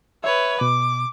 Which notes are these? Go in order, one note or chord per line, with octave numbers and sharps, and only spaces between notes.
B4 C#5 E5
B2 D6